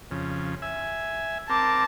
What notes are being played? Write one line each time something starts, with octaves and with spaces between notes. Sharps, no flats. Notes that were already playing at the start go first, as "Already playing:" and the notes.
F2 C#3
E5 G#5
C4 A#4 A5 D6